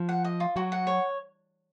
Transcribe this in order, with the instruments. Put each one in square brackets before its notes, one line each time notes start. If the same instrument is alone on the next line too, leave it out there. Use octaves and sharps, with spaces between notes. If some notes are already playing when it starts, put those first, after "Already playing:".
Already playing: [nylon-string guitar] F3
[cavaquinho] F#5
D#5
F4
[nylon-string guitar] F#3 [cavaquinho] F#4
[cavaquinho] F#5
C#5